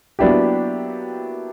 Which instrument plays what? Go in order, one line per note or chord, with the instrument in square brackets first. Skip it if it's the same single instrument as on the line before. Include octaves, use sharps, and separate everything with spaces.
[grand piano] F#3 A#3 B3 D4 E4 G4